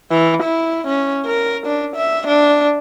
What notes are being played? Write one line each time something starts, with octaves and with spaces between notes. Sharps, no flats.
E3
E4
C#4
A#4
D4
E5
D4